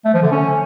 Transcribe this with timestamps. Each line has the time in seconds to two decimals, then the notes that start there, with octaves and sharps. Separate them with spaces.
0.05 A3
0.14 F3
0.23 D3
0.32 C#4